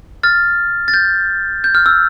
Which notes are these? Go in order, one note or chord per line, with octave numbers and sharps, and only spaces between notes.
F6 A6
A6
G6
G6
F6
E6